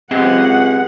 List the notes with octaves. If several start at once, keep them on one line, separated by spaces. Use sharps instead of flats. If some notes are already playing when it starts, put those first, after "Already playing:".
C#2 C4 G4 G#4 D#5 F#5